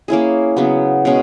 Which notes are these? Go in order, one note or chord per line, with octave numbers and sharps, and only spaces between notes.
A#3 C#4 E4 G#4
C#3 F#3 B3
B2 G#3 C#4